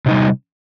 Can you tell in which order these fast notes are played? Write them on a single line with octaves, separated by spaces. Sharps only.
C3 D#4 G3